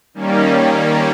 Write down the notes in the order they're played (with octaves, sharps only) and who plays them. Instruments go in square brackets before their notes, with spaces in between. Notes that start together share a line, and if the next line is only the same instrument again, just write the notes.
[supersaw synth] D#3 G3 A#3 C#4